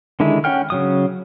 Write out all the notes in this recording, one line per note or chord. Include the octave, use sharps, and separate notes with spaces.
D3 D#3 G#3 E4
C#4 F#5 G5 F6
C#3 F#3 D#6